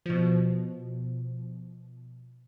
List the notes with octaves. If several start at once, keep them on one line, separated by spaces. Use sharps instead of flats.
B2 F3